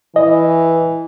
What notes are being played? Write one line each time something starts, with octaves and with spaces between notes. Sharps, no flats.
E3 D#5